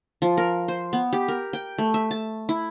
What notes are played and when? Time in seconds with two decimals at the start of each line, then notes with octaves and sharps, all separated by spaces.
0.22 F3
0.38 A#4
0.68 C5
0.93 B3
1.13 G4
1.28 A#4
1.53 G5
1.78 A3
1.94 E5
2.11 A5
2.49 E4